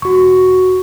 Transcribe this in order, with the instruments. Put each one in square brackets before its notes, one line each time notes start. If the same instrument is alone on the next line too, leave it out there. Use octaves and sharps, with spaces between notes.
[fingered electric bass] E1 [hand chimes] F#4 C#6